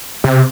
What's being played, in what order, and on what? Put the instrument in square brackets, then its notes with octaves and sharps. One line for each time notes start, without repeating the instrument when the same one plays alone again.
[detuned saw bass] C3